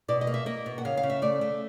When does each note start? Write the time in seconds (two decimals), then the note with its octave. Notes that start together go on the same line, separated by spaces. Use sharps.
0.08 B2 D5
0.21 D#5
0.27 A#3
0.34 E5
0.46 A#3 D#5
0.66 B2
0.78 F#5
0.85 C#3 F5
0.97 F5
1.03 C#3
1.10 E5
1.22 A3 D5
1.41 A3